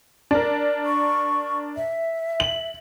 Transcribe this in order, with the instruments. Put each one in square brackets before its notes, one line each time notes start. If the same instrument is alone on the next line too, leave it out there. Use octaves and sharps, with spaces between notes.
[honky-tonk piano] D4 A#4
[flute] C#6
E5
[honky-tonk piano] F#7